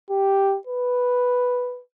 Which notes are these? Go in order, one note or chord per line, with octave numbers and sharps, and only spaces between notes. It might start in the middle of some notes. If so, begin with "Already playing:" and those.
G4
B4